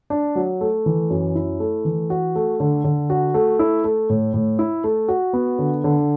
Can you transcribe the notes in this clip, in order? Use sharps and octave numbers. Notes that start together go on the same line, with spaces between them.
D4
F#3
A3
E3
F#2
E4
A3
E3
F#4
A3
D3
D3
F#4
A3
E4
A3
A2
A2
E4
A3
F#4
B3
D3
D3